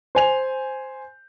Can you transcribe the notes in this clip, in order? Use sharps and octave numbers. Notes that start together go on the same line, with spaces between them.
C5 G#5 F7